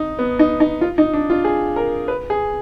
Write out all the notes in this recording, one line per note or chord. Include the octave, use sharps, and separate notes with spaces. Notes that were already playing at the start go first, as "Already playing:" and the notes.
Already playing: D#4
B3
D#4
D#4
F4
D#4
D4
F4
G#4
A#4
B4
G#4